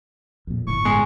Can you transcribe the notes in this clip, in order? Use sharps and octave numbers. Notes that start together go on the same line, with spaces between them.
F2 A#2
G1 A2 C#6
G#3